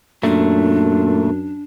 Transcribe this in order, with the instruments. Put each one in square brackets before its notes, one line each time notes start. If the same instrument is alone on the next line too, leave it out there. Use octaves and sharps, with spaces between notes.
[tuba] F#2 [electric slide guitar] A#2 A3 [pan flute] D4